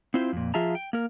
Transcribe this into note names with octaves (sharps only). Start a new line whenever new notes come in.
C4 E4 F4 C5
F2 A#2
F3 F4 G#4 E5 A5 A#5
G5
A#3 A#4